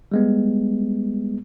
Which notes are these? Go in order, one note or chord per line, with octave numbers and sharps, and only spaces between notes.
G3 G#3 B3